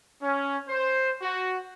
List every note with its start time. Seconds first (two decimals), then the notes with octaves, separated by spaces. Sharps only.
0.22 C#4
0.69 C5
1.22 F#4